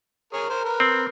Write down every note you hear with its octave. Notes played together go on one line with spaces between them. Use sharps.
G#4 A#4 C#5
A#4 C5
A#4 B4
C4